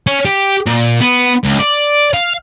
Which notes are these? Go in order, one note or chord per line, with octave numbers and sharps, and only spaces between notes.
C#4
G4
A#2
B3
C#2
D5
F5